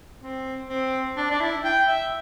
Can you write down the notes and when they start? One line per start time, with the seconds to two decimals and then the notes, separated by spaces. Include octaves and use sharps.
0.21 C4
0.69 C4
1.17 D4
1.31 D4
1.41 E4
1.64 G5
1.88 E5